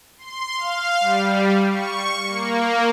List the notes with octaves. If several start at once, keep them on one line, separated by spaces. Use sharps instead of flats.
C6
F5
G3
C#6
A#3